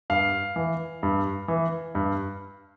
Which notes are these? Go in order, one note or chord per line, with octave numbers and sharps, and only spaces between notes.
G2 F5
E3
G2
E3
G2